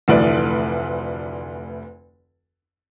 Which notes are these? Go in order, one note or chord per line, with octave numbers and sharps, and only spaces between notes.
F1 D2 E3 B4 D5